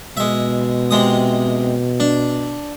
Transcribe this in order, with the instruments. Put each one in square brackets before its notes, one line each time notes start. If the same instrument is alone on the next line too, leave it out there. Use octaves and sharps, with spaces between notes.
[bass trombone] B2 [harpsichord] G#3 E5
[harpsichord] C3 G#3 D#6
D4